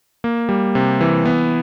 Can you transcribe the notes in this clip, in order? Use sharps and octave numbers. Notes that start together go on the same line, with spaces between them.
A#3
G3
C3
E3
B3